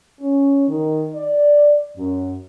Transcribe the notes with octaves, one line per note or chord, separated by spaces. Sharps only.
C#4
D#3
D5
F#2